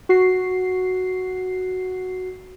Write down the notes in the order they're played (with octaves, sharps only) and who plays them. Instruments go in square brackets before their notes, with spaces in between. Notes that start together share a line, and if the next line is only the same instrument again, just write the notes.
[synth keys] F#4 C7